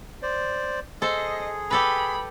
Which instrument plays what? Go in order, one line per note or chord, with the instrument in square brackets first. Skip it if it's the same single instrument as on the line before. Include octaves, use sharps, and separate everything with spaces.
[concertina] C5 D5
[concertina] G#4 [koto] A4 C5 [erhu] D#5
[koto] G4 A4 B4 [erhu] B5